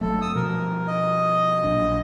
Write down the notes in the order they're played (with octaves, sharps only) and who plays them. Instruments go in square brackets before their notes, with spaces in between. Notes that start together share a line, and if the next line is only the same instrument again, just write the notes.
[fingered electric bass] G1 F#3 A3 [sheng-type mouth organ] A4
[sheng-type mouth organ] D#6 E6
[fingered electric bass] B2 F3 G3 [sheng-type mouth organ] A#4
[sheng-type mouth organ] D#5
[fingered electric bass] A#1 F#3 D4